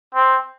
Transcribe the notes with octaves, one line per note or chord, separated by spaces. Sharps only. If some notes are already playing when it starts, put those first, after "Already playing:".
C4